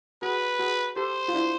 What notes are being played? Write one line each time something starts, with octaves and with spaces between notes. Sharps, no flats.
F#4 G#4 B4
F#4 G#4
G4 A4 C5
F4
D4 E4